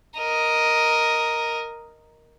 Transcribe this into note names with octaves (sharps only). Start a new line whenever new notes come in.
A#4 D#5